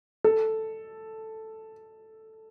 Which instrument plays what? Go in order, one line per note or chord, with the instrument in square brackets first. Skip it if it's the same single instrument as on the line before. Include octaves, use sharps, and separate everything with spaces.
[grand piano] A4